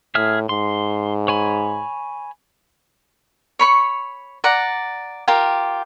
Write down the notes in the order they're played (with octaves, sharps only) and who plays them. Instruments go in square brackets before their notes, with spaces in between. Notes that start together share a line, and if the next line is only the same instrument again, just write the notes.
[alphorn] A2 [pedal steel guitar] G#4 E5 F6
[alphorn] G#2 [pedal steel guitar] C6
[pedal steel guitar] C#5 G#5 B5
[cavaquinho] C#5 B5 C#6
D5 F#5 A#5
F4 G4 A#4 G5